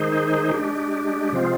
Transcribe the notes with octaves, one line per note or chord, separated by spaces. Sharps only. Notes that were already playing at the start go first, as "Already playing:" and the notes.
Already playing: D#3 G#3 D#4 G#4 C5
G#3 D4 G4
C3 F3 G#3 C4 F4